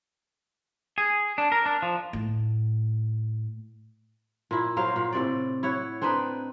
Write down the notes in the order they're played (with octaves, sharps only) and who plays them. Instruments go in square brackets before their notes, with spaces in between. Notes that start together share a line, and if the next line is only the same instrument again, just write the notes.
[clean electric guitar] G#4
D4
A#4
D4
F3
[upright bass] A2
[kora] A#2 E4
F#3 A#4 C5 F5
A#2
A2 C3 D5
E4 C#5 F#5
C4 D4 D#4 B4